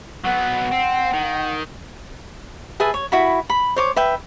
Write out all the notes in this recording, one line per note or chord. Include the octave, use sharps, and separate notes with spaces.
F#3 B3 F#5
C4
D#3
G#4 B4 E5 A5
C#5
E4 F#4 B5
B5
C5 C#5 D6
B4 E5 G5